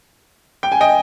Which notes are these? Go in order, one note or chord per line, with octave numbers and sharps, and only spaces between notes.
G5
G#5
D#5 G5